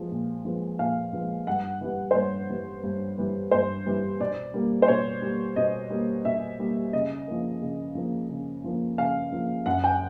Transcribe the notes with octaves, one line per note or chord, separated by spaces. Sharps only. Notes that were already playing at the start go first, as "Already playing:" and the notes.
Already playing: F3 G#3 B3
A#2
F3 G#3 B3
A#2 F5
F3 G#3 B3
G2 F#5
E3 G3 B3
C5
G2 C#5
E3 G3 B3
G2
E3 G3 B3
G2 C5
E3 G3 B3
B2 D5
G3 A#3
C5
B2 C#5
G3 A#3
B2 D#5
G3 A#3
B2 E5
G3 A#3
C#3 D#5
F3 A#3
C#3
F3 A#3
C#3
F3 A#3
C#3 F5
F3 A#3
F#2 F#5
G5